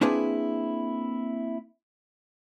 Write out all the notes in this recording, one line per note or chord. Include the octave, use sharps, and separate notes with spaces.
A#3 C4 D4 E4 G#4 B4